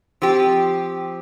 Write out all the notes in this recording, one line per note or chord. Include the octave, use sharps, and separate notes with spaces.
F3 C4 G4